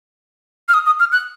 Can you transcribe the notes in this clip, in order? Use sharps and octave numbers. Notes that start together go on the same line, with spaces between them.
F6
D#6
D#6
F6
F#6